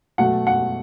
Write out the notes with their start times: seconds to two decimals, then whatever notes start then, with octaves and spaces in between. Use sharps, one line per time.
0.18 B2 F#3 A3 F#5
0.47 F#5